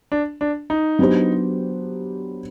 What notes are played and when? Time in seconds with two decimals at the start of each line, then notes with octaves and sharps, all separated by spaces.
0.12 D4
0.41 D4
0.70 D#4
0.99 F#3 B3 D4 G4 C5